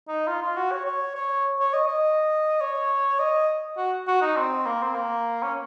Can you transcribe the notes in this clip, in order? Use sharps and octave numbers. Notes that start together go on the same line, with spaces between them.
D#4
F4
F4
F#4
C#5
C#5
C#5
C#5
D#5
D#5
C#5
D#5
F#4
F#4
D#4
C4
A#3
C4
A#3
C#4